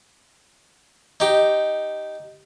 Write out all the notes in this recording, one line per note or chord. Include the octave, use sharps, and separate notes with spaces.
D#4 G4